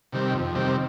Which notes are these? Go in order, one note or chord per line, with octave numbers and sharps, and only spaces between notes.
C3 D#3 G3 C4
F2
C3 D#3 G3 C4